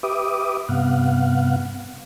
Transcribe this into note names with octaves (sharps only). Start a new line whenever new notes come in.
G4 B4 E5 D6 D#6
G2 C3 B3 F5 F#5